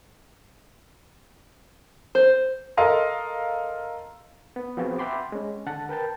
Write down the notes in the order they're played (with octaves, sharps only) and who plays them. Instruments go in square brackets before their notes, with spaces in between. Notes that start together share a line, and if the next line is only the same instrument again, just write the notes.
[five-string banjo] C5
[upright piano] A4 A#4 D#5 F5 C6
[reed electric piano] B3
F3 B3 C4 F4 F#4 G#4
E5 F#5 G5 B5 C6 D6
G#3 C#4
D3 F#5 A5
A#4 B4 G5 A5